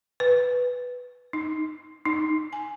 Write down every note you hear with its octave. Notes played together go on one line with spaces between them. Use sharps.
B4
D#4
D#4
G#5